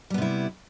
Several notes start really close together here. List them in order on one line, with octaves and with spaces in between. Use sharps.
G3 B3 C3 E4